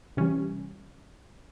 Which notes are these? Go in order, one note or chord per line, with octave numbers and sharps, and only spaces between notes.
C3 E3 G3 C#4